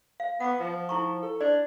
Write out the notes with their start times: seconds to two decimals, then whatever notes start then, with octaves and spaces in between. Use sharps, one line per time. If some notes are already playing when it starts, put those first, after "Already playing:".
0.20 F5
0.40 B3 F#5 D6
0.60 F3
0.89 E4 A#5 C#6
1.22 A4
1.41 D4 D5